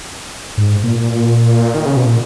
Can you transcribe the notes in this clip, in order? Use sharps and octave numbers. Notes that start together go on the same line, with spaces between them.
G#2
A#2
D#3
C#3
B2
A#2